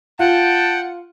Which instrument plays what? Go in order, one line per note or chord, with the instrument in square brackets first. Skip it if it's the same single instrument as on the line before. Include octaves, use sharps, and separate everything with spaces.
[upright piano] F4 [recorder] F#5 [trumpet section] G5 A5